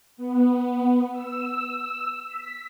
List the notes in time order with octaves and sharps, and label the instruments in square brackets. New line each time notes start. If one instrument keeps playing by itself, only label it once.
[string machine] B3
E6
B6